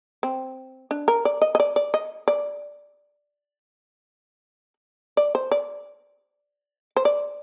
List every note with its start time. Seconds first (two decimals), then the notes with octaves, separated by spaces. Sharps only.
0.23 C4
0.91 D4
1.08 A#4
1.25 D5
1.42 D#5
1.55 D#5
1.60 D5
1.76 D5
1.94 D#5
2.28 D5
5.17 D5
5.35 C5
5.51 D5
6.96 C5
7.05 D5